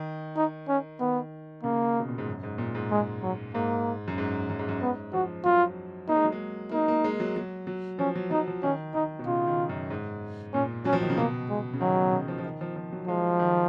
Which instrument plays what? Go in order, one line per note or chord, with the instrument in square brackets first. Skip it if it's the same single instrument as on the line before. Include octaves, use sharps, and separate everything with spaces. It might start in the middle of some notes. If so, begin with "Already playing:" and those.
Already playing: [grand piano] D#3
[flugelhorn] D#4
C#4
[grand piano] D#3 [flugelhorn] B3
[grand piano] C#3 [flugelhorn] A#3
[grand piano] B2
A#2
G#2
F#2
G#2
A#2
G#2
[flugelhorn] G#3
F#3
[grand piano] G#2 [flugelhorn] A#3
[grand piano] F#2
G#2
F#2
G#2
F#2
[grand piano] G#2 [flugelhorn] B3
[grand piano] F3 [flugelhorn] F#4
[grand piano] F#3 [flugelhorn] F4
[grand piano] A#3 [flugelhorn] D#4
[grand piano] G#3
F#3
G#3
[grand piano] A#3 [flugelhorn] D#4
[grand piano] A#3
G#3
F#3
F#3
F#3
[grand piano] F3 [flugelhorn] C#4
[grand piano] F#3
[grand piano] F#3 [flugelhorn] D#4
[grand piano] F3
[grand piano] D#3 [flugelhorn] C#4
[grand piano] D#3 [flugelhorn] D#4
[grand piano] B2
[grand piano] C#3 [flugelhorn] F4
[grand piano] D#3
F#2
G#2
[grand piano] A#2 [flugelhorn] C#4
[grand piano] F#3 [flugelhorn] C#4
[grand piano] F3
D#3
C#3
[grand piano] B2 [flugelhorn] A#3
[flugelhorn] G#3
[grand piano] C#3
[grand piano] D#3 [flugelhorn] F#3
[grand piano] B2
C#3
F3
F3
D#3
F3
F3
F#3
[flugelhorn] F3 [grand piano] G#3
[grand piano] D#3